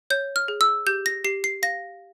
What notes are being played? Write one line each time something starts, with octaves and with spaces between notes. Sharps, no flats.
C#5 G6
F6
G#4
E6
G4 G6
A#6
G4 C7
C7
F5 A#6